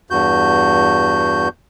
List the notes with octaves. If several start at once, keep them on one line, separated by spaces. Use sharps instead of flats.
E2 G2 F#4 G6